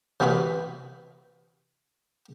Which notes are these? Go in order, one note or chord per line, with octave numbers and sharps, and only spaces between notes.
C3 E3 B3 F4 F#4 B4